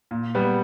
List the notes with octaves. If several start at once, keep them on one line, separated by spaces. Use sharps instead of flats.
A#2
G3 B3